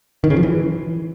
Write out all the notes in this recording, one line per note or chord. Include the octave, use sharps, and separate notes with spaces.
D#3
C#3
F3
E3